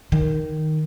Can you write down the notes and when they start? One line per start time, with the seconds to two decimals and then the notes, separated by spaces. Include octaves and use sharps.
0.12 D#3